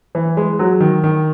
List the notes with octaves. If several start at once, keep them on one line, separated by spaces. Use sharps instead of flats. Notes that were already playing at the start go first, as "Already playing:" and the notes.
E3
G#3
F#3
D#3
D#3